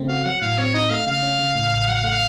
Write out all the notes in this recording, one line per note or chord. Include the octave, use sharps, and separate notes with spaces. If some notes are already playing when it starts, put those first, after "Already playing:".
Already playing: C#3 A3 C4
F#4 F5
F#3 F#5
A2 F5
C4 C#5
D#4 D#5
A3 F5
C#3 F5
C#4
C#3
A2
A1
F#3 F#5
F5
A3 F#5
F5